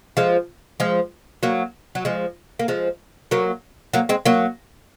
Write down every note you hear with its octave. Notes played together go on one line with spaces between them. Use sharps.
F3 G#3
F3 G#3
F#3 A#3
F#3
F3 G#3
A#3
F3 G#3
F#3 A#3
F#3 A#3
G#3 C4
F#3 A#3